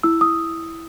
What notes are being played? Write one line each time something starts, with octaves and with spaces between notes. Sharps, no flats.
E4 E6
D#6